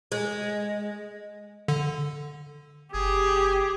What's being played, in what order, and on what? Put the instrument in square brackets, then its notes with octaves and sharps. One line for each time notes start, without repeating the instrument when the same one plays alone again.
[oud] G#3
[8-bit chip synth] D3
[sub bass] F#1 [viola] G4 [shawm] G#4